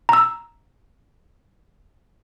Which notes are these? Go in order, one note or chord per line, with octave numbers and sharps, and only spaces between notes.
A#5 E6